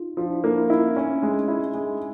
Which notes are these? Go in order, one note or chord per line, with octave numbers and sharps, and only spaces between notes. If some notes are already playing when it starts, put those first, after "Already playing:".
Already playing: D#4 F4
F3 D4 E4
D4 E4
A#3 D4 E4
D4 E4
C#4 D#4 E4
C4 D4
C#4
C4
G#3
E4
G#3